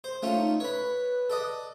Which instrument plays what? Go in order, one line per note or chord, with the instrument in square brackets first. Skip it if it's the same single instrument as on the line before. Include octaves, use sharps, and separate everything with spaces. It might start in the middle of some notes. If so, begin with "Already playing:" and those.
[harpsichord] C5
[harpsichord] A3 C#4 F4 [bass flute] F5
[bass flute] D#4
[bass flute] B4 [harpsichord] C#5 B5
[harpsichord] A4 D5 D#5